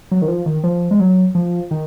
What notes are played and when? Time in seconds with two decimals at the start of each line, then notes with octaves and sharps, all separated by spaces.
0.11 F#3
0.22 D#3
0.28 F3
0.46 D#3
0.64 F3
0.91 G#3
1.00 F#3
1.35 F3
1.71 D#3